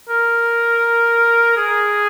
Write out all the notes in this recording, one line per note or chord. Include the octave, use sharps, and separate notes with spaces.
A#4
G#4